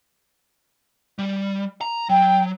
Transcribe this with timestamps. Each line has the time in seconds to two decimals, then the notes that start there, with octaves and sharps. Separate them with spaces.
1.19 G3
1.81 A#5
2.09 F#3 G5